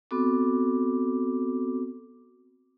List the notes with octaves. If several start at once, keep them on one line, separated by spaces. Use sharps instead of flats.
B3 C4 F#4 A4 D6